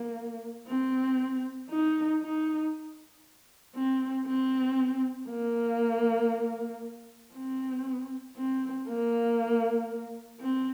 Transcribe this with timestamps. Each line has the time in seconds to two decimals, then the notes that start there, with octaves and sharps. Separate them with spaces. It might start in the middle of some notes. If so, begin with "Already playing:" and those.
Already playing: A#3
0.68 C4
1.70 D#4
2.22 D#4
3.75 C4
4.27 C4
5.29 A#3
7.34 C4
8.37 C4
8.88 A#3
10.41 C4